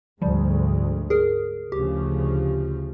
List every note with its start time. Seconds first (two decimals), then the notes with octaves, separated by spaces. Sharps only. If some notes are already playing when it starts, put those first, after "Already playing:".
0.22 D2 G#2 F3 G3
1.10 G#4 A#4
1.72 D2 C#3 F3 G4